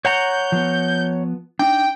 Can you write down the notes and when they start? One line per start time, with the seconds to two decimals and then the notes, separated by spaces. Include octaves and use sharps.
0.05 C#5 F#5 A#5 G6
0.52 F3 B3
1.59 D4 D#4 G5